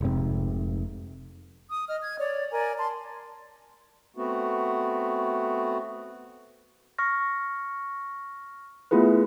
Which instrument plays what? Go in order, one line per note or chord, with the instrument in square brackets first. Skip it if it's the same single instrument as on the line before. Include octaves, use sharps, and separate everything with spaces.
[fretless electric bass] F1 G#2 C3
[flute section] D#6
D#5 F6
G#6
C#5 D5
A#4 D5 G#5
A5 C6
[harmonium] A3 B3 C4 F#4
[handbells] C#6 F6 A#6
A3 B3 E4 F4 G#4 B4